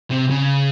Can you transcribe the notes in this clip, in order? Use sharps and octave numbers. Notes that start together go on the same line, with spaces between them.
C3
C#3